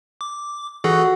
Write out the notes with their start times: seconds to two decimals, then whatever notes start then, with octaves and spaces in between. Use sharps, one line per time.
0.21 D6
0.84 E3 F#4 G#4 A4